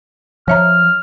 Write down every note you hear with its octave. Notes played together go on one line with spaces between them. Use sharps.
F3 C#5 E5 A#5 F6